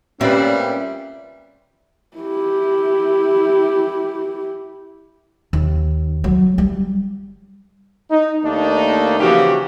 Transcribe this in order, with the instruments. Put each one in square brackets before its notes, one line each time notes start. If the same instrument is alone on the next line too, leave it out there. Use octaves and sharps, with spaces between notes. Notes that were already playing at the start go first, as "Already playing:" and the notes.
[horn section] A#2 G3 [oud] C4 [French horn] C#4 [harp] B4 D5 E5
[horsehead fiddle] E4 G4
[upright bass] D#2
F#3
G3
[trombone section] D#4
D#2 A3 A#3 D4 D#4
C#3 E3 F3 A#3 F#4 G4